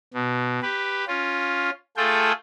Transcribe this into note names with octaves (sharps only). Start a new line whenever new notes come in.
B2
G4 B4
C#4 F4
A3 F4 G#4 A4 G5